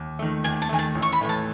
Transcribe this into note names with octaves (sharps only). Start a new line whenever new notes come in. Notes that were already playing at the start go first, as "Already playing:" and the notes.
Already playing: D#2
D#3 A3
D#2 G#5
A5
D#3 A3 G#5
A5
A1
C#6
B5
A2 E3 A3
A5